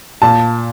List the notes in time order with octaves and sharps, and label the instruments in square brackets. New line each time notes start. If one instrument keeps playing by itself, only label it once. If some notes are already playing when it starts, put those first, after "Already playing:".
[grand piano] A#2 [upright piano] A5